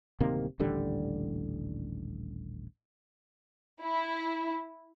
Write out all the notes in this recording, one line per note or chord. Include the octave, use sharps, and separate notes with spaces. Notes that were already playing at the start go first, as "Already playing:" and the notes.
D1 C3 D#3 A#3
D#1 A1 D3 G3
E4